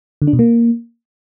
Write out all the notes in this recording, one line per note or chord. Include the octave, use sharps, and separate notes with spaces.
D3
D4
B2
A#3